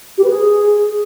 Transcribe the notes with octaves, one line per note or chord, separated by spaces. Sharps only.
G4
B4
G#4